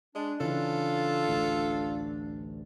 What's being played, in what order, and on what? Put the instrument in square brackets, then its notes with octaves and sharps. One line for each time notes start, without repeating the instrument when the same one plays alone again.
[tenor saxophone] G#3 [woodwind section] D4
[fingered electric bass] C#3 E3 [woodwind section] D4 [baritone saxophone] F4 [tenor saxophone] A4
[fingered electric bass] A1 D2